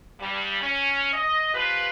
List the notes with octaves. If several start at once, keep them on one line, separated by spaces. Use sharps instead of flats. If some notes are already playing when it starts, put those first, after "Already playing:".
G2 G3
C#4
D#5
F3 F4 G4 B4